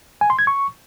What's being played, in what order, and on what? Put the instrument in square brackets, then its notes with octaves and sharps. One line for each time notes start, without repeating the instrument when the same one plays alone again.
[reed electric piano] G#5
C6
G#6
C#6